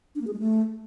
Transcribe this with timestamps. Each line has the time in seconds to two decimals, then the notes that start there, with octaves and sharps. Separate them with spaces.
0.15 D4
0.21 A#3
0.27 G#4
0.33 G#3
0.39 A3